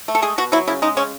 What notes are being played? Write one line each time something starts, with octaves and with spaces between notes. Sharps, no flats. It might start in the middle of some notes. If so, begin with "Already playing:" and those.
A3
A4
G#3 G#4
B2 F#4
F#3 E4
C#3 E4
G#3 D#4
C#3 C#4